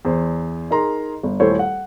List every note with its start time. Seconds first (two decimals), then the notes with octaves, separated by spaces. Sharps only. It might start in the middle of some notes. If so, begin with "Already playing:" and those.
0.05 E2 C5
0.71 D#4 G#4 A#4 A#5 C6
1.23 G1
1.40 D#1 A3 E4 C5 C#5
1.59 F#5